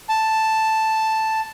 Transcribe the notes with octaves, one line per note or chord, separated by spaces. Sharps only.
A5